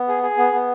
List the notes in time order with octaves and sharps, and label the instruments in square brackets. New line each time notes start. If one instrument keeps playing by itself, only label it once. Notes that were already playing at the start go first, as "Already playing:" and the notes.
Already playing: [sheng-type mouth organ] B3
G#4
G#4
B3
B3